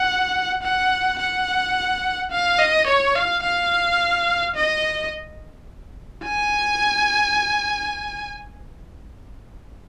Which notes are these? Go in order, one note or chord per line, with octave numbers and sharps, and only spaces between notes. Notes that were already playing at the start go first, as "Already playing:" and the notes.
Already playing: F#5
F#5
F#5
F5
D#5
C#5
F5
F5
D#5
G#5